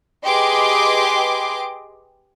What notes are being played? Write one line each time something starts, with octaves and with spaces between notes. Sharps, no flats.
G4 G#4 B4 D#5 C6 D6